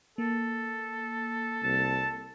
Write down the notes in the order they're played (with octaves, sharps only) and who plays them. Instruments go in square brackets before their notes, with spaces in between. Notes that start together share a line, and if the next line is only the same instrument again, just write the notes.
[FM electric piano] A#3 [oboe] A4
[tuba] C2 [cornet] A5